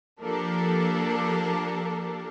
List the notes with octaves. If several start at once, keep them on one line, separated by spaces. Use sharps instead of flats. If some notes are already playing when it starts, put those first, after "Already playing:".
F3 A#3 D4 G4 A4 A#4